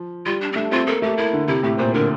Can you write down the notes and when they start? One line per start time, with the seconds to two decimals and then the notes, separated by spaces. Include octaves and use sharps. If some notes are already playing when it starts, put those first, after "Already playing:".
Already playing: F3
0.26 G3 F4
0.41 D4
0.52 C4
0.56 A3 D4
0.71 C4 F4
0.87 A#3 A4
1.02 A3 G4
1.17 A#3 E4
1.33 D3
1.48 C3 E4
1.63 A2 G4
1.78 A#2 C5
1.94 D3 A#4